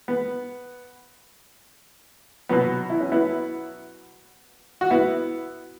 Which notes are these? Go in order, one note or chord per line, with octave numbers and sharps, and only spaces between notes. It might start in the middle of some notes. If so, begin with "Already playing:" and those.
B3
B2 F#3 B3
E4
C#4
B3 E4
F#4
B3 E4